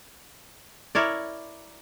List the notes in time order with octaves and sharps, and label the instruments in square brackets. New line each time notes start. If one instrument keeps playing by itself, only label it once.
[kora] E4 A#4 C#5 D5